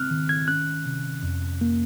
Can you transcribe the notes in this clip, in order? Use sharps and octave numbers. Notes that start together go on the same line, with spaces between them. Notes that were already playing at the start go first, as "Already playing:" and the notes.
Already playing: C#3 C4 F6 F#6
D#3
G#6
C#4 F#6
C3
F2
A#3